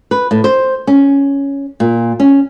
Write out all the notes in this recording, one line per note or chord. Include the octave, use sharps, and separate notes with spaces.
B4
A2
C5
C#4
A#2
C#4